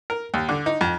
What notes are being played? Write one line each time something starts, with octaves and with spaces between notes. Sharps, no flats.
A#4
D#2
D3
D#4
F2